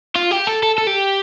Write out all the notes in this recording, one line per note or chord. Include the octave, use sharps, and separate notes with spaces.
F4
G4
A4
A4
A4
G4